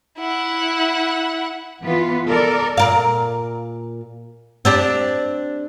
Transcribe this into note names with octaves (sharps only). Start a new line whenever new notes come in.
E4 F#5
E3 B3 F4 B4
A4 A#4 D5
A#2 A#4 F5
C4 D4 G4